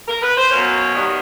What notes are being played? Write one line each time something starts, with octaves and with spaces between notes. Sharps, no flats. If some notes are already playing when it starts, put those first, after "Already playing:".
A#4
B4
C5
B2 F#3 A#3 C#4 C#5
D#3 G3 B3